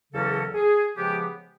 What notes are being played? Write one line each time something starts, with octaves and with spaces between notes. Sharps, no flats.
E2 C#3 F#3 A#3 C#4 A4
G#4
C#3 F3 G#3 B3 G4